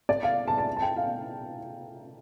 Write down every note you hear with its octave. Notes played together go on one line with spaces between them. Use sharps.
D5
F5
A5
A5
A5
G5
F5